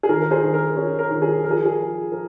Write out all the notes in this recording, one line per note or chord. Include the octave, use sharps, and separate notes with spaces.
G#4
D#3 A#4
A#4
G#4 C5
D#3
A#4
C#4 G#4
A#4
D#3
G#4
F3 A#4
G#4
G#4
F3
F3 A#4